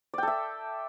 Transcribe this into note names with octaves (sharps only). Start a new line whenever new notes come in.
A4 D5 E5 G5